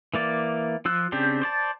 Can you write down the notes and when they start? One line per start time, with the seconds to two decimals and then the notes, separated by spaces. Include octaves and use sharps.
0.14 E3 A#3 D5
0.85 F3 F4 E6 F#6
1.12 C#3 C4 D4 G4 C5
1.42 C5 D5 A5